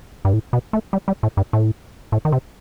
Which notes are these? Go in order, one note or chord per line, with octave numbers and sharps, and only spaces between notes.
G2
A2
B2
A3
G3
G3
A2
G2
A2
A2
D#3
C3